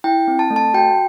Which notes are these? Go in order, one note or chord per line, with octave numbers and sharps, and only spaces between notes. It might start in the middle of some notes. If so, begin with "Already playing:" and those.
E4 G5
C4
A5
A3
A5
F#4 G5